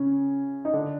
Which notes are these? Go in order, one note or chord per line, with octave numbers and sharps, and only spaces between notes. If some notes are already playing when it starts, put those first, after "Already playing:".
Already playing: C#3 C#4
D#4
D3 D4